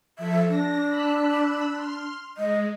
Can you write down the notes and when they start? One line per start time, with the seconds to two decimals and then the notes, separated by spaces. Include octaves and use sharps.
0.18 F3 A4 E5
0.48 D4 A#6
0.89 B5 E6 F#6
1.74 C6 F6
2.37 G#3 D#5